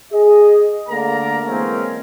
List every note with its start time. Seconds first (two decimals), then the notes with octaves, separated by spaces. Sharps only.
0.13 G#4 D#5
0.89 D3 A3 A#3 A#4 D5 A#5
1.47 E3 G#3 A#3 C4 C#4